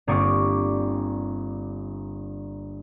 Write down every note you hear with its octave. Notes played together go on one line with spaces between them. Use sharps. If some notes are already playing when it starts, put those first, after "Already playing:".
G1 A#3 C4 D5 C#6 D#6